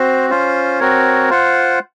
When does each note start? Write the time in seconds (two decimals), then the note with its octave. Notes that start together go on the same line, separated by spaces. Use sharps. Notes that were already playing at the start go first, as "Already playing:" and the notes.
Already playing: C4 F#4 C5
0.30 C#4 F4 C5
0.80 C4 F#4 A#4 C#5
1.30 F4 C5 F#5